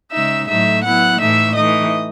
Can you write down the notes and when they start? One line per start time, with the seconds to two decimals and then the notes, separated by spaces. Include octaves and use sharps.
0.12 C#3 G#3 D#4 E5 E6
0.47 A2 F#3 A3 D#4 E5 E6
0.83 F#3 B3 E4 F#5 F#6
1.19 A2 E3 A3 D#4 E5 E6
1.55 E3 A3 D#4 D#5 D#6